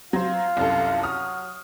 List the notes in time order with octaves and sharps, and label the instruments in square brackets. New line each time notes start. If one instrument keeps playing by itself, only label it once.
[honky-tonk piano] F#3 C5 [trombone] F4
[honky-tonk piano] C2 F#2 A4
[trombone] F#3 [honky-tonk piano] D#6 F6